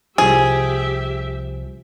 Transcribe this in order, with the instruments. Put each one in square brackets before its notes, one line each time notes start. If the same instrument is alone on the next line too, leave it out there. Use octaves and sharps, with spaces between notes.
[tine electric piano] C2 F3 [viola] G4 E5 [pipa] G#4